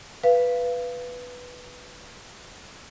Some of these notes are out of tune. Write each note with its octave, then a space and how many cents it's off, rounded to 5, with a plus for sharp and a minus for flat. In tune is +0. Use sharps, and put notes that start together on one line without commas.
B4 +0 F5 -25